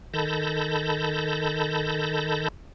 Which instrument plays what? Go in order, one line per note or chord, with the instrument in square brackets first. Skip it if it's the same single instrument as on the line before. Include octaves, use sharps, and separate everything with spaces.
[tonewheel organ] D#3 A4 A5 B5 G6 A#6